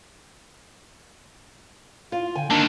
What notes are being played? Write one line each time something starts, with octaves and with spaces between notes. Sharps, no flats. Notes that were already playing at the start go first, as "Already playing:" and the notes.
F4 F5
D3 G5 G#5
D3 D#3 A#3 D4 D#4 A5